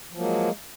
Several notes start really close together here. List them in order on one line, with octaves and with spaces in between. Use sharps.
F3 F#3 A#3 G#3